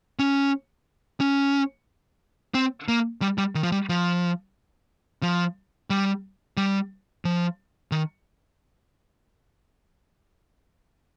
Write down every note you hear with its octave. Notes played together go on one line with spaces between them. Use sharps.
C#4
C#4
C4
A#3
G3
G3
D#3
F3
G3
F3
F3
G3
G3
F3
D#3